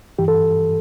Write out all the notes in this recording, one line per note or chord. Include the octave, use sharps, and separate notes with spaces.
G2 E3 G4
A4